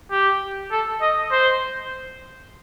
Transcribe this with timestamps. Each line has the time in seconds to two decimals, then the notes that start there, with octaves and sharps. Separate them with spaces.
0.11 G4
0.71 A4
1.01 D#5
1.32 C5